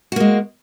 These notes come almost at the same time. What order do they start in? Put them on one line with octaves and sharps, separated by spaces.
F#4 A#3 G#3